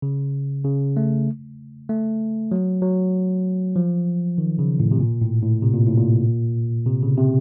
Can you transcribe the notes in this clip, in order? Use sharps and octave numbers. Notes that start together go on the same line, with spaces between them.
C#3
C#3
A3
A3
F#3
F#3
F3
D#3
C#3
A2
C3
A#2
A2
A2
C3
A#2
A2
A#2
C3
C#3
C3